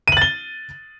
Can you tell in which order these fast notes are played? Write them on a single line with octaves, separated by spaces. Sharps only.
D#7 F#7 A6 G7